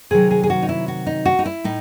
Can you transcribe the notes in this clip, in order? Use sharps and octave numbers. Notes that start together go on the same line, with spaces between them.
C3 D#3 F#3 G#4
G#4
G#4
F#4
D#4
E4
F#4
D#4
F#4
D#4
E4
A2 D#4